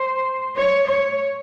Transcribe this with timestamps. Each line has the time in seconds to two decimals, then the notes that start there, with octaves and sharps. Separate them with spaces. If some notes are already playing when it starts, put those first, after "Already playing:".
Already playing: C5
0.56 C#5
0.88 C#5